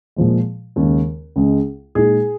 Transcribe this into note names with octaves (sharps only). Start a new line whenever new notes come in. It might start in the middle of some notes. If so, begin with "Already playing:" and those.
A#2 F3 G#3
D#2 C#3 G#3
C#2 C#3 G#3
A#2 G#3 D#4 G#4